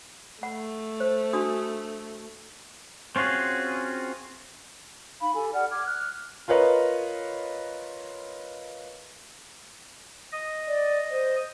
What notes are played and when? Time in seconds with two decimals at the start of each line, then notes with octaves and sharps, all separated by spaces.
0.43 A3 F#5
1.00 C5
1.33 D4 F#4 D#6
3.16 C4 C#4 F4 F#4 G#4
5.21 D#4 F5 B5
5.35 G4 A4 G#5
5.53 G4 D5 F#5 F6
5.70 D6 F6 G#6
5.86 F6 F#6
6.48 F4 A#4 B4 C#5 D#5
10.32 D#5
10.68 D5
11.11 C5